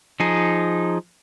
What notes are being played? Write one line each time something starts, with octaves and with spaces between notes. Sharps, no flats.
F3 D#4 G#4